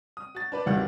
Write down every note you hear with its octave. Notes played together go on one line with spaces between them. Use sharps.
D#6
F#4 A6
D4 B4 D5
G#1 E2 D3 D#3 G3 F#5